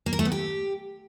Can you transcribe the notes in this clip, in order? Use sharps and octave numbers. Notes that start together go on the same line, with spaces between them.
A#3
A#4
A3
B3
G4